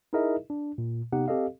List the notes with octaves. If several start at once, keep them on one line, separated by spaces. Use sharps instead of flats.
D#4 E4 G#4 A#4 D#5 E5
D4
A#2
C3 B3 D#4 G4 F#5
C4 G4 A4 D#5 F5